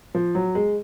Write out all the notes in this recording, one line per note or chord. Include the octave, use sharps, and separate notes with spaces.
F3
F#3
G#3